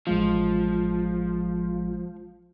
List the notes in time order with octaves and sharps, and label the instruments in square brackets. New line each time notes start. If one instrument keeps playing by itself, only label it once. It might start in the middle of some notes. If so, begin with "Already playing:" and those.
[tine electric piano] A1 G#3 F4 [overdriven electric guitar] F3